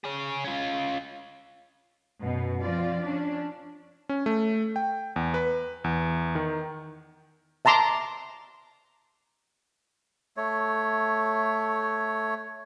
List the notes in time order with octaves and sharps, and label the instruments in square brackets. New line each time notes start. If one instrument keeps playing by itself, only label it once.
[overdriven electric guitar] G#4 C#5
C#4 F4
[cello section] F#2 B2
F3 C4 F4 D5
C#4 D4
[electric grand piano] C#4
A3
G5
E2
B4
E2
D#3
[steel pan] E5 A5 A#5 C6 D6
[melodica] A3 C#5